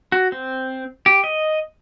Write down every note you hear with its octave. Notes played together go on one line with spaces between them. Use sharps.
F#4
C4
G4
D#5